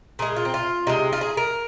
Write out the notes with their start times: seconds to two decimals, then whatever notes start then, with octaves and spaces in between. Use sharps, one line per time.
0.19 A#2 G#3 G#4
0.36 F4
0.45 C4
0.54 F4
0.87 C3 G#3 D#4
1.13 F4
1.21 G#4
1.37 A#4